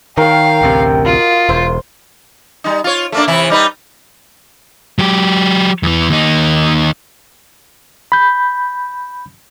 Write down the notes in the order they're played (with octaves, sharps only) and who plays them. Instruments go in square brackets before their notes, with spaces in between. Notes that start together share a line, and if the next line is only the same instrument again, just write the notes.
[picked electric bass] D#3 [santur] A#4 C#5 [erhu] F5 [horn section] G5
[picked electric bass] A1 D2 C3
[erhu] F4 [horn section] F#4 D#5 F5
[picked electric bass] E1 [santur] C5
[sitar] G3 D#4
F4 C#5
A3 A#3 D4
C3 E3 E4
G3 D#4 B4
[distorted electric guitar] F#3 G4
E2 E3
D#2 D#4
[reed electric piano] B5 G6